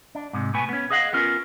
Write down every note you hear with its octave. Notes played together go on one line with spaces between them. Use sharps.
D4
G#2 C3
B2 A3 B3 G#5
B3 C#4
G#4 D#5 F5 F#5
B3 C#4 F4 A#4